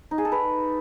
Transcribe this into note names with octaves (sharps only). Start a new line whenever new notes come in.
D#4
G#4
A4
B4